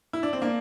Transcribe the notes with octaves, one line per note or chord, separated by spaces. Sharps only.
E4
D4
C4
A#3 D4